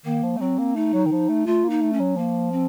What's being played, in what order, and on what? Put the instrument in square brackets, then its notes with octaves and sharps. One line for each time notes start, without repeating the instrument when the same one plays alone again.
[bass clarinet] D#3 [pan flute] A#3
[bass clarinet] F3
A3
[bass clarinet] F#3 [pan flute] C4
[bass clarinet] A#3
[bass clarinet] A3 [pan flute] D#4
[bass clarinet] F#3
D#3
F3
A3
[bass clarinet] A3 [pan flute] F4
[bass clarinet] A#3
[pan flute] D#4
[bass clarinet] A3
[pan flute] C#4
[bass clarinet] F#3
[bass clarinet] F3 [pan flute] A#3
[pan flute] C4